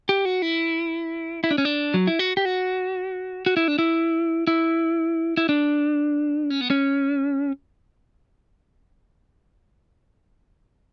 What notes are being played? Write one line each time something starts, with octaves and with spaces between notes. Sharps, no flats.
G4
F#4
E4
E4
D4
C#4
D4
F#3
E4
F#4
G4
F#4
F#4
E4
D4
E4
E4
E4
D4
C#4
B3
C#4